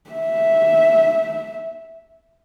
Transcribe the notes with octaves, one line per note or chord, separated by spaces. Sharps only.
E5